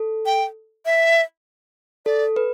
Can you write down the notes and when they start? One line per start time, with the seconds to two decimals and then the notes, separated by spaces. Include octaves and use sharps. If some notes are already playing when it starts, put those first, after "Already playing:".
Already playing: A4
0.26 G5
0.86 E5
2.06 A4 D5
2.36 B4